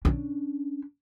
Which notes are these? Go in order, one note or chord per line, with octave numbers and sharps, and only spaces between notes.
C#4 D4